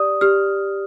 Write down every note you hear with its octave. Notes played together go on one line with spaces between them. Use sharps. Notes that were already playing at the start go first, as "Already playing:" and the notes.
Already playing: G4 D5 D#6
G4 F6